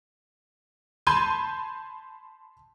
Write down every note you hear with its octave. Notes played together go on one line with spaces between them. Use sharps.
A5 B5 C6 G6 G#6 D#7